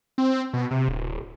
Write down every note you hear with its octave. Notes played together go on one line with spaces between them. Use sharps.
C4
B2
C3
D1